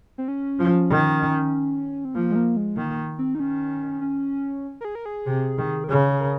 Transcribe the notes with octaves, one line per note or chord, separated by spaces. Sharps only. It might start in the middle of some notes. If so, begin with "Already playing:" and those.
C4
C#4
F3
D#3
C4
F3 A#3
G#3
A#3
G#3
D#3 A#3
C4
D#4
D#3 C#4
C#4
A#4
G#4
A#4
G#4
C3
D#3
A#4
C#3 G#4
A#4